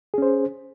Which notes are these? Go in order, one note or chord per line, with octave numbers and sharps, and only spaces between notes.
C#4 G#4 C5